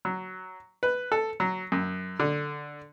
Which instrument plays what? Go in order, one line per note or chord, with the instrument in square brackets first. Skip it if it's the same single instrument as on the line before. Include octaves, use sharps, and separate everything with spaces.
[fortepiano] F#3
B4
A4
F#3
F#2
D3